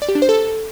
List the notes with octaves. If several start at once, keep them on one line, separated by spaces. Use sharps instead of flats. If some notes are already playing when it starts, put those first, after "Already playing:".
D5
G4
D4
C5
A4